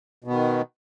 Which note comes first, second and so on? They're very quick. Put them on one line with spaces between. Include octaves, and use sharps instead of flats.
B2 B3 D#3